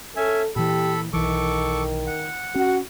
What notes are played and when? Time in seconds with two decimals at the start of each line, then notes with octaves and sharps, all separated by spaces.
0.16 C#4 A4 E5 G#5
0.56 A#2 E3 G4 A4 B5
1.13 B1 D#3 E3 A4 C#6 D6
2.07 F#5
2.55 C#4 F#4